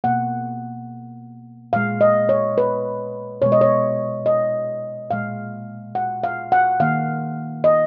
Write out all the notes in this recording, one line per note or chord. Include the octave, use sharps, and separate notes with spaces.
B2 A#3 F#5
A#2 G#3 F5
D#5
C#5
B4
B2 G#3 C#5
D#5
C#5
D#5
A#2 G#3 F5
F#5
F5
F#5
D#3 A#3 F5
D#5